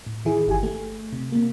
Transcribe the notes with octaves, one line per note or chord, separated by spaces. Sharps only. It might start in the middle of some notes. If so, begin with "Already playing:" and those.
A2
D#3 E3 E4 G#4
G1 G4 G#5
A3
C3
C3 A#3